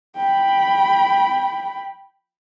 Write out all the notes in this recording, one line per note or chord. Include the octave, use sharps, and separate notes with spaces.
G5 B5